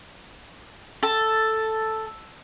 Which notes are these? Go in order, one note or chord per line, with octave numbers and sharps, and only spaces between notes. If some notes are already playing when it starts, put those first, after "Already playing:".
A4